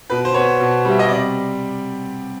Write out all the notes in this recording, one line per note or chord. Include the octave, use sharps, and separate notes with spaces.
B2 B4
C5
B3 C#5
B2
G3
E5
D#5
C3 D5